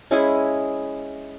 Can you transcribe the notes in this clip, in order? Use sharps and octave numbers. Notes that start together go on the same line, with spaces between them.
G#3 C#4 E4 G#4